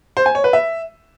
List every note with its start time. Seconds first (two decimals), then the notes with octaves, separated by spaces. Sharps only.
0.17 C5
0.26 G#5
0.35 C#5
0.44 B4
0.53 E5